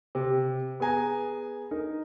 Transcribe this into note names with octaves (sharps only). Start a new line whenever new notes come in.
C3
B3 G#4 G#5 A#5
D#4 A#4